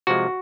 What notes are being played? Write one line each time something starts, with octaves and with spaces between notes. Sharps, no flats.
C3 F3 G#3 F#4